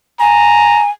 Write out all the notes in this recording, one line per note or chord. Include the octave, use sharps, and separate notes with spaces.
G#5 A#5